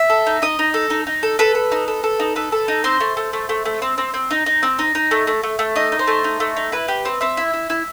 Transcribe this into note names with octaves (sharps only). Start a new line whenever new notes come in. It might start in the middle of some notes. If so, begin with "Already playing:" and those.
Already playing: E5
A4
D#4
D#4 D#5
D#4
A4
D#4
D#4
A4
A4 B4
A4
D#4
A4
A4
D#4
A4 B4
A4
D#4
C4 C5
A3
A3
A3
A3
A3
C4
C4
C4
D#4
D#4
C4
D#4
D#4
A3
A3
A3
A3
D#4 D#5
D#4
C5
A3
D#4
A3
D#4
E4 B4
G4
C4
C4 E5
E4
E4
E4